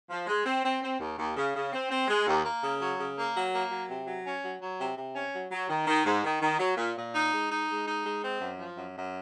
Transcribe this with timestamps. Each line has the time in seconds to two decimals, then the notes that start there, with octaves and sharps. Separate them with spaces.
0.10 F3
0.27 G#3
0.46 C4
0.64 C4
0.82 C4
1.00 D#2
1.18 D#2
1.36 C#3
1.55 C#3
1.73 C4
1.90 C4
2.08 G#3
2.27 D#2
2.45 A#3
2.63 C#3
2.81 F#3
2.98 C#3
3.16 A#3
3.34 F#3
3.53 A#3
3.72 F#3
3.89 C3
4.07 F#3
4.25 C#4
4.43 F#3
4.61 F#3
4.79 C3
4.97 C3
5.15 C#4
5.33 F#3
5.52 F#3
5.69 D#3
5.87 D#3
6.05 G#2
6.24 D#3
6.42 D#3
6.60 F#3
6.77 A#2
6.96 A#2
7.14 D#4
7.32 G#3
7.51 D#4
7.69 G#3
7.86 D#4
8.05 G#3
8.22 C4
8.40 F#2
8.58 F3
8.76 F#2
8.95 F#2